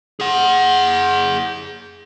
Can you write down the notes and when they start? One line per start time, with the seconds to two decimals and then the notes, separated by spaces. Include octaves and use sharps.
0.20 G#4 F#5